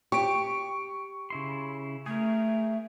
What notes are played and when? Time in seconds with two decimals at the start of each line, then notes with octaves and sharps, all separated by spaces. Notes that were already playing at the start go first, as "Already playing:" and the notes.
0.12 G4 C#6 D7
1.30 C#3 E4 C6
2.06 A3 G#4 A#4